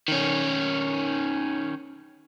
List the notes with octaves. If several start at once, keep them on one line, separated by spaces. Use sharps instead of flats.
D#3 C#4